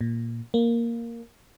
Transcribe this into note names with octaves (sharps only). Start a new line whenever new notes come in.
A#2
A#3